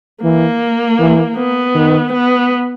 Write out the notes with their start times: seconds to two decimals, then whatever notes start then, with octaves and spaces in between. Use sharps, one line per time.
0.23 E3 A#3
0.99 E3
1.37 B3
1.75 D#3
2.13 B3